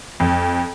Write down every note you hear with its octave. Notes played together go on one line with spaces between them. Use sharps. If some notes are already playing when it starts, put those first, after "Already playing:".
F2